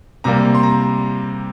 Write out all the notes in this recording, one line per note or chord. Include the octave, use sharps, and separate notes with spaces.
C3 G3 A#3 A#5
C6
A#5